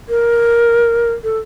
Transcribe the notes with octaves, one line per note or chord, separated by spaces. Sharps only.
A#4
A4